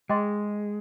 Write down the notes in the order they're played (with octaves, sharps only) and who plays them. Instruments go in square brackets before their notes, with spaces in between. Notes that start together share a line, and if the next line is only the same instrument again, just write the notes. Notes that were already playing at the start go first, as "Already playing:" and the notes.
[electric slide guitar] G#3 [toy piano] G#4 D#5 G5 C6